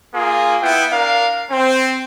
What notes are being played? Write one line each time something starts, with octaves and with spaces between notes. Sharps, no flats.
A#3 F4 G#4
B3 E4 G5
D4 A#4 F5
C4